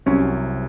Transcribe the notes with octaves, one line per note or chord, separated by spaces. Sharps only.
C2 C3 F#3 C#4